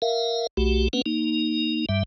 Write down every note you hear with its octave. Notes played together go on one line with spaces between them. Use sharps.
A#4 E5 F5
B1 A3 F#4 G4
A#3 C4 C#4 B4 F#5
A#3 D#4
G2 G3 E5